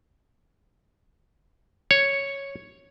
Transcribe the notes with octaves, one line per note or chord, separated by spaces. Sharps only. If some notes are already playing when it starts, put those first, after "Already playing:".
C#5